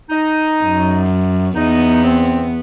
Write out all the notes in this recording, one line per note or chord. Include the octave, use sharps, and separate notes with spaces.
D#4
F#2
E2 B3 D#4
C4